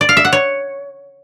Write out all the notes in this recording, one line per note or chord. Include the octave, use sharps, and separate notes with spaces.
D5
F5
E5
F#5
C#5